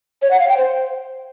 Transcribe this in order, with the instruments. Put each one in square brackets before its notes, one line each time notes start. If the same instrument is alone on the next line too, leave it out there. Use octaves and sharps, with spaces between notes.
[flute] C#5
F#5
F5
G5
C5